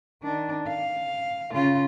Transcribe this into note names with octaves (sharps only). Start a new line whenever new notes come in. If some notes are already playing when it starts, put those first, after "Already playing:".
D#3 D4
F5
C#3 F4